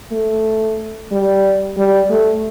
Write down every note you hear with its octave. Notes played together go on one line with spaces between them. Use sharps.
A3
G3
G3
A3